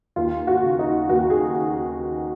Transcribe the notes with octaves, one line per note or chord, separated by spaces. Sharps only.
D#2 F4
F#4
C#3
D#4
D#2 F#4
G#4